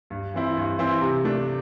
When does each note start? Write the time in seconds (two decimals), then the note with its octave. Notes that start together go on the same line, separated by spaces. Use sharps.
0.10 G2
0.34 E3 C4 E4
0.57 G2
0.79 E3 C4 E4
1.01 C3
1.24 A3 D4